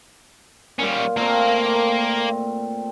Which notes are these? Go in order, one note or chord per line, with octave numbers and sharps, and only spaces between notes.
A#2 G3 C#4 D6
A#2 A3 A#3 C4 A#4